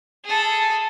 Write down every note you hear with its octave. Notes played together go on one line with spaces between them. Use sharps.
G#4 A4